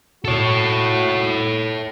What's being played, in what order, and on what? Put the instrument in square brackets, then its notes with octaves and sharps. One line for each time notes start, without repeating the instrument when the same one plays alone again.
[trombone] F#4 [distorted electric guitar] A4 C#5